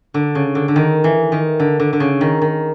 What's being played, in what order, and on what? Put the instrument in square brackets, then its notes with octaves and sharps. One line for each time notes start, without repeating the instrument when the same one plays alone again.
[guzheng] D3
C#3
D3
D3
D#3
E3
D#3
D3
D3
D3
C#3
D#3
D#3